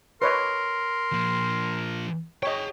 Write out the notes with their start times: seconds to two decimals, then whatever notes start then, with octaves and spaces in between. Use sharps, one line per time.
0.22 A#4 B4 C#5 D#5 C6
1.12 A#2 F3
2.43 G#4 C#5 D#5 G5